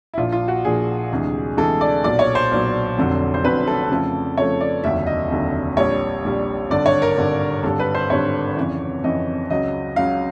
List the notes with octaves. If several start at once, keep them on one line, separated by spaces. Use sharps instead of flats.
E4
A#1 A#2 F3 F4
F4
F#4
A#1 A#2 F3 G#4
D2 C3 E3 G#3
D2 C3 E3 G#3 A4
D5
B1 A#2 F#3 D5
C#5
C5
B1 A#2 F#3
F1 F2 D3 F#3
C5
F1 F2 D3 F#3 B4
A4
F2 C#3 F3 A3
F2 C#3 F3 A3 C#5
D5
F1 D#2 D3 F#3 E5
D#5
F1 D#2 D3 F#3
A#1 A#2 G3 C#5
A#1 A#2 G3
G#1 G2 D3 D5
C#5
A#4
G#1 G2 D3
G#1 G2 D3 G3 A4
B4
C5
G#1 G2 D3 G3 C#5
F2 C#3 E3
F2 C#3 E3 D#5
C#2 C#3 F#3 D#5
C#2 C#3 F#3 F5